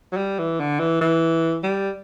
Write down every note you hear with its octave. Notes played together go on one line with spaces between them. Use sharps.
F#3
G3
E3
D3
E3
E3
G3